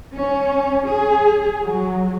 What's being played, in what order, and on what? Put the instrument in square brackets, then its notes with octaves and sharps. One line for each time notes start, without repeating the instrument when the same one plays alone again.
[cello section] C#4
G#4
F#3